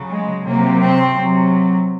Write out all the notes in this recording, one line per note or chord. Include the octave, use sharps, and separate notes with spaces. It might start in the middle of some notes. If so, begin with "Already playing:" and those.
Already playing: C#3 F#3
G#3
C3 F#3 A#3
C4
C3 F#3